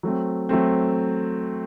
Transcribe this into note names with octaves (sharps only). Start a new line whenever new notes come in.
F#3 A3 C4
F#3 A3 C4